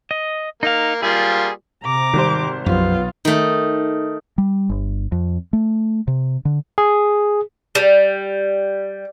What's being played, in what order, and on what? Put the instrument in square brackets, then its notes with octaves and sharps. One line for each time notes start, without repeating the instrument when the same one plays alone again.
[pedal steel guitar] D#5
[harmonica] A#3 [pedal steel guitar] D#4 F5
[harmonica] G3 A#3 F4 [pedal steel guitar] G#4
[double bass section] C3 [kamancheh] A#5 D6
[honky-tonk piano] G#1 G3 C5 [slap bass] D#3
[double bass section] B1 F#3 B3 [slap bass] F#2 F3 [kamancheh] F4
[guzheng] D#3 A3 [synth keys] D#4
[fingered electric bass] G3
G1
F2
A3
C3
D3
[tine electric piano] G#4
[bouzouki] G3